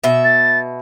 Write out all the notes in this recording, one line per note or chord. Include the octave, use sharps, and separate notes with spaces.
B2 E5
A6